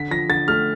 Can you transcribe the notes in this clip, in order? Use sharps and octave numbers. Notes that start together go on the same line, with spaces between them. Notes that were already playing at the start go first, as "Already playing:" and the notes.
Already playing: D3 B6
F3 A#6
D3 A6
A3 F6